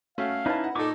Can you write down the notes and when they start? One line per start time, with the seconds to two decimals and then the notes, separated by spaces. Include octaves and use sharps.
0.18 A3 C#4 F#4 F5
0.46 C#4 D#4 E4 B4 A5
0.64 F#5
0.75 A#2 D#4 A4 C#6 D6